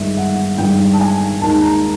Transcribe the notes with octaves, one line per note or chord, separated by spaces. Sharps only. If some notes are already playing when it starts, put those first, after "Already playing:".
Already playing: G1 G2 D#3 G#3 E5
F#5
G1 G2 D#3 G#3 G5
A5
G#5
D#2 D#3 G#3 A5
A#5